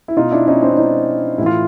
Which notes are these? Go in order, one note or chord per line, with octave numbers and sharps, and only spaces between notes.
E4
B2 D#4 F4
D4 E4
C#4 D#4
C4 D4
E4
C#4 D#4
A2 E3 E4 F4